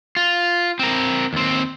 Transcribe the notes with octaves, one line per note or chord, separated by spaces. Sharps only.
F4
C4 A#4
D#2 C4